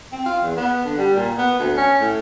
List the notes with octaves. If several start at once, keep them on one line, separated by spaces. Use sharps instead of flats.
C4
F4
E2
B3
D3
G3
A#2
B3
D2
C#4
A2